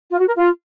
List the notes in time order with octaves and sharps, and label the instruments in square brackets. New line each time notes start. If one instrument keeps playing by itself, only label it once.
[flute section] F4
F#4
A#4
F4